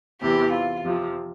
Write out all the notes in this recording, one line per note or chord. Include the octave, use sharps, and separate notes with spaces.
E2 C3 E3 G4
F4
F2 C3 F3